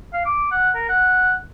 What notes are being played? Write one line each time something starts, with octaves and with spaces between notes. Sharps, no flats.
F5
D6
F#5
A#4
F#5